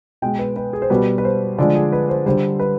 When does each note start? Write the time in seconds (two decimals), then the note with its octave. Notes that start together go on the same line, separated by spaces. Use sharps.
0.22 B2 G#3 G5
0.39 B4
0.56 B4
0.73 G#4
0.82 C5
0.90 B2 G3 B4
1.18 B4
1.24 C5
1.58 D3 F3 G#3 D5
1.75 G#4
1.92 B4
2.09 C5
2.26 D3 G3 C5
2.59 B4